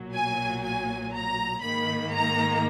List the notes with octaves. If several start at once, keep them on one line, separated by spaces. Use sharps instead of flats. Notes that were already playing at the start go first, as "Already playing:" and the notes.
Already playing: B1 A#2 F#3
G#5
G#5
A#5
G#2 D#3 A#3 B5
A#5